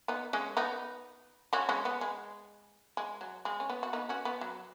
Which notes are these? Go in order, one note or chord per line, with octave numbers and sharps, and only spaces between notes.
B3 D#4
G#3 C#4
B3 D#4
C#4 F#4
G#3 C#4
B3
G#3
G#3
F#3
G#3
C#4
B3
F#4
B3 D#4
C#4 F#4
B3
F#3